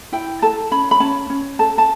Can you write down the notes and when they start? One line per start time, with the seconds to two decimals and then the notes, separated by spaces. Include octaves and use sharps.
0.12 E4 G5
0.42 A4 A5
0.72 C#4 B5
0.91 B5
1.00 C#4 A5
1.30 C#4
1.59 A4 A5
1.78 A5